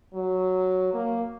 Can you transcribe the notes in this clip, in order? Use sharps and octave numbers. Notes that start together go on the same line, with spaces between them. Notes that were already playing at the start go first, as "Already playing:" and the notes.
F#3
A#3